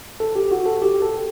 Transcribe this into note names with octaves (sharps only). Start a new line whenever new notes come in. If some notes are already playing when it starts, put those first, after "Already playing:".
A4
G4
F#4
A4
G4
A4